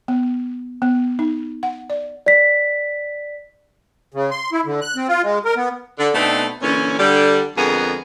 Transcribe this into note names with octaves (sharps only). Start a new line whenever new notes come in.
B3
B3
D#4
F#5
D5
D5 B6
C#3
C6
E4
D3
F#6
C4
F4
G#3
A#4
B3
D3
B2 A3 B3 C4 D4 D#4
A#2 D3 E3 C#4
D3 G3
F2 D3 G#3 B3 G#4 A#4